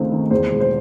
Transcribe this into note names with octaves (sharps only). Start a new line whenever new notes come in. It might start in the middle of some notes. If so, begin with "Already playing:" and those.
Already playing: C#2 D#3 A3 C4
D#3
E2 C5
E1
C5